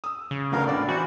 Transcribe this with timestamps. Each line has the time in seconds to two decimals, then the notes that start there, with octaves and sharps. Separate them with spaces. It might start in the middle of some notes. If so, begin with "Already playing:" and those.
0.04 D#6 E6
0.31 C#3
0.52 G#1 D2 B3 A#4 F5 A#5
0.67 A2 B3 D4 D5
0.88 E3 E4 F#4 C5 D5